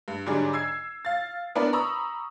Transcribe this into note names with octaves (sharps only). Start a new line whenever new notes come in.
G2
G#2 D3 F#3 G3 D4 G#4
E6 G#6 C7
F5 A6
B3 D4 E4 A#4 B4 D5
A#5 B5 C#6 D#6 E6